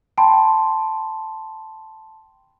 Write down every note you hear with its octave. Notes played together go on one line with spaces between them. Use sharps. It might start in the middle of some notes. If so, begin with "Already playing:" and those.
G5 A5 B5 C6